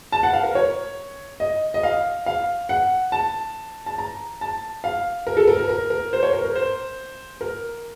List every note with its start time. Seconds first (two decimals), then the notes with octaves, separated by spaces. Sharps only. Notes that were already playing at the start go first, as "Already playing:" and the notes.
0.12 A5
0.23 F#5
0.33 F5
0.43 A#4
0.55 C#5
1.40 D#5
1.74 D#5
1.83 F5
2.26 F5
2.69 F#5
3.12 A5
3.86 A5
3.98 A#5
4.41 A5
4.84 F5
5.27 A#4
5.37 A4
5.47 A#4
5.59 A#4
5.69 A#4
5.90 A#4
6.13 C5
6.23 C#5
6.33 A#4
6.44 A#4
6.55 C5
7.41 A#4